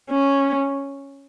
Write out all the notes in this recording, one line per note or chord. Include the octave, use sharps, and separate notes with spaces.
C#4